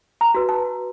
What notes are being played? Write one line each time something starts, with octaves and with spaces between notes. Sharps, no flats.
A#5
F#4 B4
A5